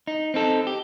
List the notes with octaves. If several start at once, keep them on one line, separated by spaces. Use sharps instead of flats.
D#4
C4 D#4 A4
G4